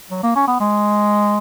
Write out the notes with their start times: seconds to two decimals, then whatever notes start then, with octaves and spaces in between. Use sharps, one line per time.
0.11 F#3
0.23 A#3
0.36 C#4
0.48 B3
0.60 G#3